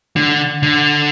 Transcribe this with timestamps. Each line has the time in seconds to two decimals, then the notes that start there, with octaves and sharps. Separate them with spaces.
0.16 D3
0.63 D3